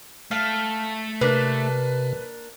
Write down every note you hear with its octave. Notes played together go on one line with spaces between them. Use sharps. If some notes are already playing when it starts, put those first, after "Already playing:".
A3 F5
C3 A#3 D4 B4